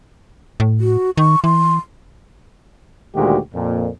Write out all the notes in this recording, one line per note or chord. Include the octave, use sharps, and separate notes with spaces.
A2
F#4
D#3 C#6
E3 C6
D2 A#2 D#3 G#3 F#4 G4
F2 A#2